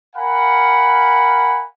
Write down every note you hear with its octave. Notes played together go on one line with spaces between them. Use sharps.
A#4 F5 F#5 G#5 B5